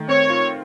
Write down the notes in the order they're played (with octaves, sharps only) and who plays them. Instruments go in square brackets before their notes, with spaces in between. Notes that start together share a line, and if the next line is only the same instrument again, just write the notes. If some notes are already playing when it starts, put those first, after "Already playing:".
Already playing: [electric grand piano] D#3 A3
[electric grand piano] C4 [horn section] C#5
[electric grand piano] F4